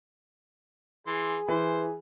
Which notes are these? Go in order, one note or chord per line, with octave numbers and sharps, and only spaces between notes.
E3 G#4 C6
E3 C5